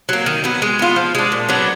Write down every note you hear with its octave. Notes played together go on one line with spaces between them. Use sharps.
F#3 A#3
D#3
F#3 B3
G#3
B3 F4
F3
G#3 D4
A#2
F#3 B3 D4